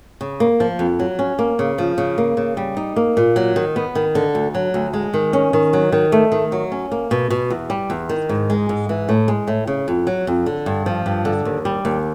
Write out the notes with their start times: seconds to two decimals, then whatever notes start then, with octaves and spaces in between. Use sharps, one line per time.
0.21 C#3
0.40 A#3
0.60 F3
0.79 F2
0.99 F#3
1.19 C#4
1.39 A#3
1.59 C#3
1.78 F3
1.98 C#3
2.18 A#3
2.37 C#3
2.57 G3
2.77 D#4
2.96 A#3
3.17 A#2
3.36 F#3
3.56 D#3
3.76 B3
3.95 D#3
4.15 D3
4.35 D2
4.55 F#3
4.74 D2
4.94 G#3
5.14 D#3
5.33 C#4
5.53 D#3
5.73 F#3
5.92 D#3
6.12 A3
6.32 D#3
6.52 F#3
6.72 C#4
6.92 A#3
7.11 B2
7.30 B2
7.50 E2
7.70 G3
7.90 E2
8.09 D#3
8.29 G#2
8.50 G#3
8.69 G#2
8.89 E3
9.09 A2
9.28 G#3
9.47 A2
9.67 C#3
9.88 F2
10.07 F#3
10.27 F2
10.46 D3
10.66 G2
10.86 F3
11.06 G2
11.25 D3
11.45 D#2
11.65 G3
11.85 D#2